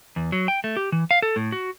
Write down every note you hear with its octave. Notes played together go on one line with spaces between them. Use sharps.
E2
F#3
G5
A3
G4
E3
F5
A4
A2
F#4